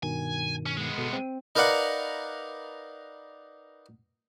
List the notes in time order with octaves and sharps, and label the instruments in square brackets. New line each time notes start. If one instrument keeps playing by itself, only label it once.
[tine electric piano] G2 B2 D#3 [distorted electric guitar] G#5
[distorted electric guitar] C#4
G#3 B3
[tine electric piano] G1 B2 A4
C4
[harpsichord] D#4 A#4 B4 D5 F5 F#5